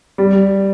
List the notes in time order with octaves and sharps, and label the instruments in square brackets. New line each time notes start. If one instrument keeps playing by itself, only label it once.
[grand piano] G3